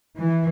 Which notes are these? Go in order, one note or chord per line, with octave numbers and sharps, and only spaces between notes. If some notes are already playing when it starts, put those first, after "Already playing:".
E3